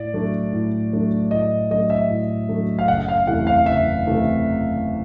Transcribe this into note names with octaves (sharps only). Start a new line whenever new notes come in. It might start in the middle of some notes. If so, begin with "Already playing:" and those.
Already playing: A2 D5
F#3 A3 D4
A2
F#3 A3 D4
A2 D#5
F#3 A3 D4 D#5
E5
A2
F#3 A3 D4
F5
F#1 F#5
F5
E2 C3 E3 A3 F#5
F5
F#1 E5
C3 E3 A3